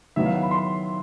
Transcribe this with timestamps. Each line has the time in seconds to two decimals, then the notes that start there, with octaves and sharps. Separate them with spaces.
0.16 D#3 F#3 B3 E4 E5
0.25 F5
0.34 F#5
0.43 B5
0.51 C6